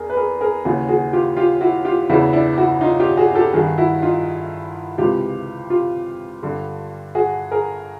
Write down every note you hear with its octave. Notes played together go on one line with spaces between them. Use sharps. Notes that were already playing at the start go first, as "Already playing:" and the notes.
Already playing: E2 G#4 A#4
B4
G#4 A#4
G#4 A#4
D#2 C#3 E3 F#4 G#4
F#4 G#4
F4 G4
F4 G4
E4 F#4
F4 G4
E2 C#3 E3 E4 F#4
D4 E4
E4 F#4
D#4 F4
F4 G4
F#4 G#4
G4 A4
G2 D#3 F#4 G#4
E4 F#4
D#4 F4
C#2 C3 E3 F4 G4
F4 G4
G2 D3
F#4 G#4
G#4 A#4